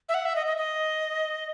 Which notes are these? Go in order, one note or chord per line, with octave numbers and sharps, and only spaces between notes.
E5
F#5
E5
D#5
D#5
D#5